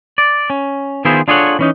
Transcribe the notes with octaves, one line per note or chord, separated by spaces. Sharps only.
D5
C#4
D#3 B3 E4 F4 G#4 C5
D4 F4 G#4 A4 C#5 F#5
E3 C#4 D#4